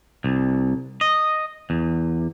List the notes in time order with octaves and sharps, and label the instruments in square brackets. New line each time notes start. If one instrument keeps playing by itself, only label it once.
[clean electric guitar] C2
D#5
E2